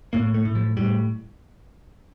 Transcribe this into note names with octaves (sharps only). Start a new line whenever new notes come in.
A2 A#3
A3
A2
F3
A2 G3